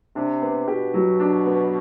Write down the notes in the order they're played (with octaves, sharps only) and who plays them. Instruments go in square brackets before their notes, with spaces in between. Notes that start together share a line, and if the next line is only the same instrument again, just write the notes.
[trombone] C3 [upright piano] D4
[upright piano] B3
[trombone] B2 [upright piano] G4
[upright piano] F#3
D4
B3